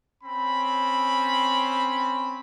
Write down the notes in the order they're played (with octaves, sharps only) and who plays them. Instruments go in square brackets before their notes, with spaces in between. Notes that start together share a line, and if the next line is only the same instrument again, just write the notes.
[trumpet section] C4 C#4 B5